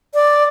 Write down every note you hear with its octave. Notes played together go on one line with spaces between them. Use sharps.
D5